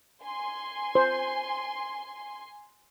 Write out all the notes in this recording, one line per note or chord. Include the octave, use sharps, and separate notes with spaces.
G#5 C6
C5